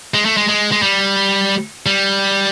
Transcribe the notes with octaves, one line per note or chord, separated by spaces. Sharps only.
G#3
A3
G#3
G#3
G#3
G3
G3